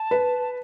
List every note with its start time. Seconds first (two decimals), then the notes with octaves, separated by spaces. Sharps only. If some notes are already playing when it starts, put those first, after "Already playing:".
Already playing: A5
0.11 B4